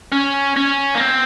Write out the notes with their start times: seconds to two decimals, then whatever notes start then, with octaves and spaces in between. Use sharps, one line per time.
0.12 C#4
0.57 C#4
0.95 A#3
1.00 C4